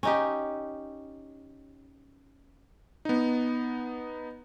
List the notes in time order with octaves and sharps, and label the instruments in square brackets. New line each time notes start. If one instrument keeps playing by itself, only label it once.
[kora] C#4 D#4 G4
[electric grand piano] B3 D#4